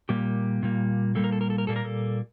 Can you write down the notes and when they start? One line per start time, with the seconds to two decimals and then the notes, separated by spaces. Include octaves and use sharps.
0.09 A#2 G3 A#3 G4
0.63 A#2 G3 A#3
1.15 A#2 G3 A#3 A4
1.24 A#4
1.32 A4
1.41 A#4
1.50 A4
1.58 A#4
1.67 A#2 G3 A#3 A4
1.76 A#4
1.85 A4